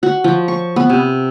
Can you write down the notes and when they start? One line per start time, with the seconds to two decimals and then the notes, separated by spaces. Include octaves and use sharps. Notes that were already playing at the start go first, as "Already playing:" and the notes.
0.03 F#4
0.24 F3
0.48 C#6
0.76 B3
0.89 C3